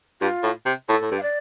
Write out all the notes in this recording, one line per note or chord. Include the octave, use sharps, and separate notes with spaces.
G2 F4
A2
C3
A2 A4
A2
G2
F5
D5